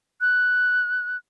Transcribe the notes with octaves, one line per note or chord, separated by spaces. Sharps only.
F#6